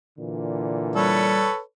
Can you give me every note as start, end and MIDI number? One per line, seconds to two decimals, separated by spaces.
0.18 1.50 46
0.18 1.50 50
0.18 1.50 52
0.96 1.48 55
0.96 1.59 69
0.96 1.59 71
0.96 1.59 73